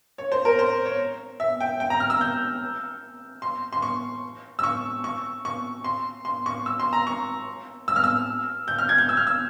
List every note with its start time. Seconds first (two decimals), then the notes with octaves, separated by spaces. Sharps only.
0.18 C#5
0.32 C5
0.45 A#4
0.59 C5
0.85 C#5
1.40 E5
1.61 G5
1.80 G5
1.90 A#5
2.00 F6
2.10 E6
2.21 G6
3.42 C6
3.73 C6
3.82 C#6
4.59 E6
4.64 C#6
5.04 C#6
5.45 C#6
5.84 C6
6.25 C6
6.46 C#6
6.66 E6
6.80 C6
6.93 A#5
7.07 C#6
7.88 E6
7.96 F6
8.04 E6
8.68 G6
8.78 F6
8.89 G#6
8.98 G6
9.09 E6
9.17 F6
9.27 E6